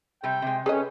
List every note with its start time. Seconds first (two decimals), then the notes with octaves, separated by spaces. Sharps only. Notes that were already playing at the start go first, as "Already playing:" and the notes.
0.23 C3 G3 G5
0.42 C3 G#3
0.66 C#4 G#4 A4 B4 D#5